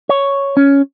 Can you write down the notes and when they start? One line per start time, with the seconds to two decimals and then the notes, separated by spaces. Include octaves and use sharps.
0.09 C#5
0.57 C#4